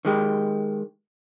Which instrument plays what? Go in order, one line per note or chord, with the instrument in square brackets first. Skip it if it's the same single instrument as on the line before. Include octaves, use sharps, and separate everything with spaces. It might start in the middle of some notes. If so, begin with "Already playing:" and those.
[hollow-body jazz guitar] D#3 G#3 G4